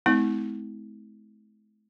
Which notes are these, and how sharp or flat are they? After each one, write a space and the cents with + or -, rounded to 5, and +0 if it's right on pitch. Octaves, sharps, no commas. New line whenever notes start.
G#3 +45 C4 -40 E4 -40